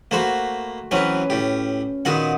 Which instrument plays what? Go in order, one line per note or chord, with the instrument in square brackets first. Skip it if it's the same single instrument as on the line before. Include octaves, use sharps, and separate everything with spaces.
[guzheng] A3 F#4 [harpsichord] A#3 C5 B5
[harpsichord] E3 F#3 C4 [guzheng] C#4 B4
[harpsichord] A2 G4
[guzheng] A#2 D#3 B3 [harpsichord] F#4 F#5